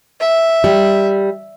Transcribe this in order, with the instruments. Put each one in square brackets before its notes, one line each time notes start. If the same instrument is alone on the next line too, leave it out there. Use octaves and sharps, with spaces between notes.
[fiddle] E5
[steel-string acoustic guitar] G3